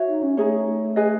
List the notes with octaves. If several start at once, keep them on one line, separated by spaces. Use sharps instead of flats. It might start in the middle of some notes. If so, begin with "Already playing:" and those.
Already playing: F#4 C#5 E5
D#4
C#4
A3 D#4 G#4 C#5
G#4 B4 D#5 G#5